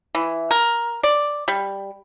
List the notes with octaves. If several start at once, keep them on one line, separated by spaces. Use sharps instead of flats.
E3
A#4
D5
G3